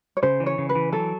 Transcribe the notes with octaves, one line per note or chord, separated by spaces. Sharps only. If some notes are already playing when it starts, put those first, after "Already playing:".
C#5
C#3 C5
E3
C#5
C#3
B4
E3
F#3 A4